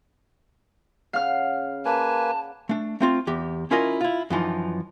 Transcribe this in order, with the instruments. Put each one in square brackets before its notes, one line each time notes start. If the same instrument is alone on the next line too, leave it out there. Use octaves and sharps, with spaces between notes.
[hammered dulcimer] C#3 F#5 G#5 [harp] F5 F6
[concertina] A#3 B4 G#5 [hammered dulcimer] D5 B5 [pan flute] A5
[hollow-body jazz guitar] A3 D4
A3 C4 F4
E2 G4
C#4 E4 F4 A#4 D#5
E4 F4
F#2 E3 F3 D#4